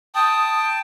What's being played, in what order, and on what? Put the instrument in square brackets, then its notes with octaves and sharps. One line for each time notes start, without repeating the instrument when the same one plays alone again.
[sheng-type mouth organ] G5 A5 [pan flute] D#6